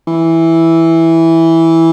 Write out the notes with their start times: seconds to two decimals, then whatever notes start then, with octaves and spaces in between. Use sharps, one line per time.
0.08 E3